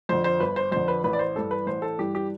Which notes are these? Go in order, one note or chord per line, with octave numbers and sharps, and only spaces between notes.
F2 D3 C5
C5
G1 B4
C5
F2 D3 C5
B4
A1 B4
D5
C5
G2 E3 G3 A4
B4
A1 C5
A4
G2 E3 G3 G4
G4